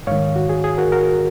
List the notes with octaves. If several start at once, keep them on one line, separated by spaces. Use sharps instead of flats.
G#2 D#3 C#5 F5
F#4
G#4
G#4
F#4 A#4
F#4 A#4